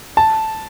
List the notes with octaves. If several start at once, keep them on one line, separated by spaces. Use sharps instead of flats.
A5